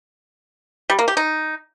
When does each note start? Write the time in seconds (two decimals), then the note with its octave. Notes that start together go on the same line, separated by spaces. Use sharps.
0.90 G3
0.99 A#3
1.08 G4
1.17 D#4